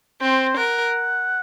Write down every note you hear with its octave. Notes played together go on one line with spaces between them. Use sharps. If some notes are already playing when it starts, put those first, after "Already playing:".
C4 C5
A#4 F#5